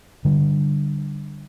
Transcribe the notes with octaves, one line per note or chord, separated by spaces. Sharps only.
D3 G3